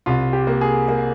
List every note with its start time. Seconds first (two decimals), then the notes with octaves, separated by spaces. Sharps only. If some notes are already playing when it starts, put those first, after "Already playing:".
0.06 C2 F4
0.33 G4
0.47 A#3
0.61 G#4
0.88 A#3